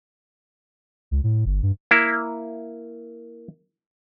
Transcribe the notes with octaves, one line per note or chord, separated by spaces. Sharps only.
C#2
A2
G1
G2
A#3 E4